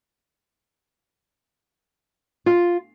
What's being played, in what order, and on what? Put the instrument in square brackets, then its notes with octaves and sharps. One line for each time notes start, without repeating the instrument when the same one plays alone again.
[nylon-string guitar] F4